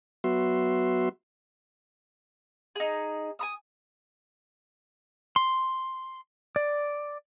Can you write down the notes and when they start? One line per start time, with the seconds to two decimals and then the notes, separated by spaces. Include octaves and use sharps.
0.24 F#3 B3 F#4 E5 C6
2.75 D#4 G#4
3.39 G#5 A#5 D#6
5.36 C6
6.56 D5